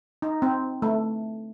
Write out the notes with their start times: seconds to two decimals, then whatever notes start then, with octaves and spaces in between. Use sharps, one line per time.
0.22 D#4
0.42 C4
0.82 A3